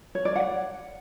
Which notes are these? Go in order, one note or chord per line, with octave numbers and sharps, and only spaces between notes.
C#5
D5
F#5